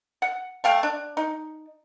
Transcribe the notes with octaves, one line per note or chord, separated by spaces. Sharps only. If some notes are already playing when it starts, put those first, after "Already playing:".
F#5
A3 F5 G5
D4
D#4